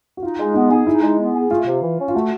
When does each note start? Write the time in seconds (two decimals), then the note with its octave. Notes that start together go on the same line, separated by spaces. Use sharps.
0.17 F#4
0.23 D#4 F4
0.38 G#3
0.54 B3 D#4
0.71 D#4 G#4
0.87 D#4 E4
1.02 G#3
1.18 B3
1.34 G#4
1.50 A3 F4
1.66 C3
1.82 E3
1.98 C#4
2.08 F4
2.14 A3 F#4